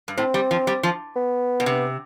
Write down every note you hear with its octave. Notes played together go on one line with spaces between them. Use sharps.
G2
A2 C4
G3
F3
G3
F3
B3
B2
C3